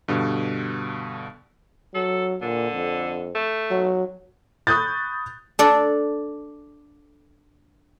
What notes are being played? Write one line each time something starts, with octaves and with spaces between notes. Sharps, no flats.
G2 B2 D3
F#3 A4
A#2 D3
F2
A3
F#3
B5 C#6 D#6 F#6 G6 A6
D4 A4 D5